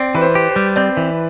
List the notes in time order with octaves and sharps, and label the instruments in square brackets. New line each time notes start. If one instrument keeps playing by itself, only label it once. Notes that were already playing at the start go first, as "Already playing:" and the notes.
Already playing: [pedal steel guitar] C4 [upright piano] D5
[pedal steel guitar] E3 [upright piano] B4
[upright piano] C5
[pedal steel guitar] G4
[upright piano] C5
[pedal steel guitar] G3
[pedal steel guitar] C4 [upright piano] D5
[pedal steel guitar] E3